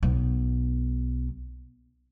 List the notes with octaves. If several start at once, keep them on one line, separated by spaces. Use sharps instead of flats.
B1 B3